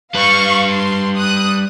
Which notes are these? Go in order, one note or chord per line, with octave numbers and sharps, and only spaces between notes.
G3 B4 F5 C#6
C6
D#6 F#6